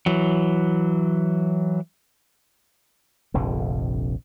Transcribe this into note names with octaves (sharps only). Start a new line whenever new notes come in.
E3 F#3
F1 A#1 F2 D3